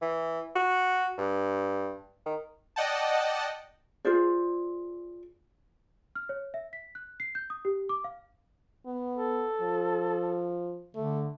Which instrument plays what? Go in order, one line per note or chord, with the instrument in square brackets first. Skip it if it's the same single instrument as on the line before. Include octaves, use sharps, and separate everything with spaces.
[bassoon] E3
F#4
G2
D#3
[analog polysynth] D5 D#5 F#5 G5 A5
[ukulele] F4 G#4 C5 D5
[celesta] F6
C#5
E5
B6
F#6
C7
G6
D#6
G4
D6
F5
[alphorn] B3
[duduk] A4
[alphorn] F3
[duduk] D3 [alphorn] A3